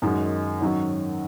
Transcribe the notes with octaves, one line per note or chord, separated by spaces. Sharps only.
F#2 D#3 G#3 D#4 F#4
G#2 D#3 F#3 C#4 F#4